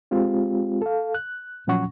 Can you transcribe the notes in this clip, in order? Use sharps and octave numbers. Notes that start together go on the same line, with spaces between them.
G#3 C4 F4 G4
A4 F5
F#6
A#2 F3 F#3 C#4 F#5 C#6